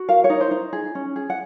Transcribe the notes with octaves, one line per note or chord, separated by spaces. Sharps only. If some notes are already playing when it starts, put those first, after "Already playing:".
Already playing: F#4
A#4 F5
C#5
D#4
C5
D#4
G#4
C#4
G#4
F#5